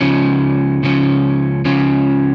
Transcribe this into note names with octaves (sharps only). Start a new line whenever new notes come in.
C#2 C#3 F3 C#4
C#2 C#3 F3 C#4
C#2 C#3 F3 C#4